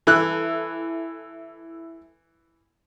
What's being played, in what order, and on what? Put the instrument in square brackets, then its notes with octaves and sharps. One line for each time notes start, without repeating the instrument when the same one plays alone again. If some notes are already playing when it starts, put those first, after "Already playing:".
[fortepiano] E3 F#6 [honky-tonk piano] E4 A4